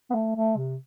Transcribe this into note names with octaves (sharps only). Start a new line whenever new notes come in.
B3
A3
A3
C3